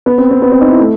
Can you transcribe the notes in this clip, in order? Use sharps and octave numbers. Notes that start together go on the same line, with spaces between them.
B3
C4
C4
B3
C4
D#4
E4
A3